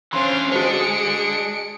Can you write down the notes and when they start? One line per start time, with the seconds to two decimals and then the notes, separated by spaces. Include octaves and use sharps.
0.13 E3 C#4 D4 C5 F5 C6
0.52 G#3 D4 F#4 A4 C5 C#7 D7